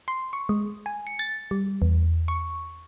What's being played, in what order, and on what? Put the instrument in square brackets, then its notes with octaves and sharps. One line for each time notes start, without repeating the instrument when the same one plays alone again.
[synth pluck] C6
C#6
G#3
G#5
C#7
A6
G3
E2
C#6